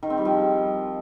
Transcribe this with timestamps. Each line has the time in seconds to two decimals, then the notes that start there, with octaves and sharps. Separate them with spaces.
0.03 D#3
0.10 C4
0.18 G3
0.25 F3